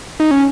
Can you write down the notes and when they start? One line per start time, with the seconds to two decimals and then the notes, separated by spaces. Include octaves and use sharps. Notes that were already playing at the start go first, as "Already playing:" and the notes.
0.20 D#4
0.31 C#4